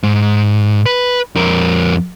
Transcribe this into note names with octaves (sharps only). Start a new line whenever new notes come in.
G#2
B4
F2 A#4